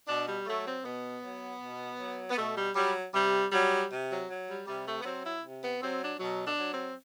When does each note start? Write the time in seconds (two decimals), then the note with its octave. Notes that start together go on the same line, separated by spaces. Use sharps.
0.07 B2 D4
0.26 G3
0.46 F#3 A3
0.65 C4
0.84 B2 B3
1.23 F#3
1.61 B2
1.98 F#3
2.30 B3
2.37 B2 A3
2.56 G3
2.75 F#3 G3
3.13 C3 G3
3.52 F#3 G3
3.90 C3
4.10 F#3
4.29 F#3
4.48 G3
4.67 C3 G3
4.85 A3
5.00 B3
5.05 F#3 C4
5.24 E4
5.44 C3
5.62 B3
5.81 F#3 C4
6.01 D4
6.20 B2 F#3
6.45 D4
6.58 F#3
6.71 C4